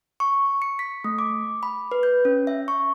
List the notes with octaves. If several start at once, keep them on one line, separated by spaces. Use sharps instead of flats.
C#6
C#7
B6
A3
D6
B5
B4
G6
C#4
E5
C#6